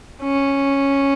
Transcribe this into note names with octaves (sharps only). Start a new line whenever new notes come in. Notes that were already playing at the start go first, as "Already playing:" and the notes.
C#4